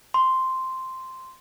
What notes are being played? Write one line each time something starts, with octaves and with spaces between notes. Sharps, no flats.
C6